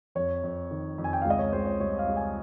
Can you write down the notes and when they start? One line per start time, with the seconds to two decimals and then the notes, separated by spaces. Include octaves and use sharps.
0.15 F2 C#5
0.43 F2
0.71 D#3
0.98 F2
1.04 G#5
1.13 G5
1.22 C#2 F5
1.30 D#5
1.39 C#5
1.53 C#2 C5
1.66 C#5
1.80 G3 C#5
1.99 F5
2.08 C#2
2.17 G#5